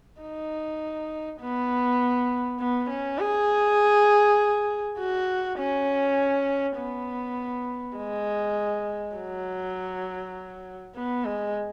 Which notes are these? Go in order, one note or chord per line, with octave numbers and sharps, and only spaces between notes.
D#4
B3
B3
C#4
G#4
F#4
C#4
B3
G#3
F#3
B3
G#3